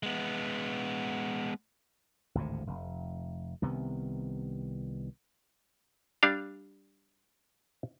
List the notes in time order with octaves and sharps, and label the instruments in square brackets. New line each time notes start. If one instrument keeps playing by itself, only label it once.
[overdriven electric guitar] G#3 B3
[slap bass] G#1 D2 A2 C3
F1
C2 C3 D#3 B3
[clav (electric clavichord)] G3 D4 F5